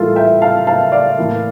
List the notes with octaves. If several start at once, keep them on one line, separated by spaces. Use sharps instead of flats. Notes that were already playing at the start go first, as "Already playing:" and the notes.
Already playing: A2 E3 G3 A#3 F4 A4
E5 G5
F5 A5
F5 A5
D5 F5
A2 E3 A#3